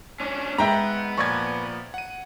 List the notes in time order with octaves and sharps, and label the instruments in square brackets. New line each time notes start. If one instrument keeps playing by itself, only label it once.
[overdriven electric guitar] C#4 D4
[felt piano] G#2 [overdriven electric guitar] B3 [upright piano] E5 G5 A#5
[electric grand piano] A#2 F3 D5 [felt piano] C#6 G#6
[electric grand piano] F#5 D#7